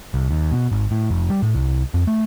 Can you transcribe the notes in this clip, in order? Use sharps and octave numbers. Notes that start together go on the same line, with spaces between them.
C2
D#2
B2
G#1
A2
F1
G3
A2
C2
F2
A3